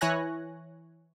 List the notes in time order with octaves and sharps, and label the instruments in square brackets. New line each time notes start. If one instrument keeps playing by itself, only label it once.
[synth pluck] E3 E4 C#5 G#5 F#6 A#6